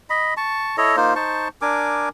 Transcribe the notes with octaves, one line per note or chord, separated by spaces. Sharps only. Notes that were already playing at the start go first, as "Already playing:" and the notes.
D#5 B5
A5 C#6
E4 A4 C#5 D#5
A#3 D#4 F4 C5
D#4 C5 A5 C#6
D4 A#4 G#5 D6